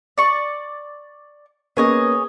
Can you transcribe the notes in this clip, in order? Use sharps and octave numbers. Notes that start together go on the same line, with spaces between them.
D5 C#6
A#3 B3 C#4 G#4 C#5 D#5